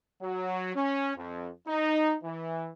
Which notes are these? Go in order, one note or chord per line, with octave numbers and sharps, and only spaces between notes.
F#3
C#4
F2
D#4
E3